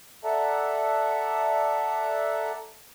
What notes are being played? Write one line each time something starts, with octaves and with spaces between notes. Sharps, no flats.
A4 D5 E5 F#5 A5 A#5